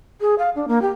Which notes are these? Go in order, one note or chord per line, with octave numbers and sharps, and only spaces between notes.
G#4
F5
D4
A#3
G4